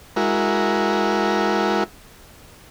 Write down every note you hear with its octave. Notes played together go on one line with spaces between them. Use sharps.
G#3 E4 F#4 A#4